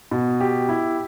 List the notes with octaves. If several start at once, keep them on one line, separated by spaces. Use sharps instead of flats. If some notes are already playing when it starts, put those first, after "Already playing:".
B2
G4
E4